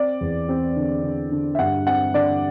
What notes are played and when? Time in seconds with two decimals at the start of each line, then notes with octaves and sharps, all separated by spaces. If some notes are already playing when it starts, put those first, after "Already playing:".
Already playing: C4 D5
0.21 E2
0.49 C4
0.76 D3
1.04 D3
1.32 D3
1.55 E5
1.59 G2 F#5
1.87 C4 F#5
2.14 D3 D5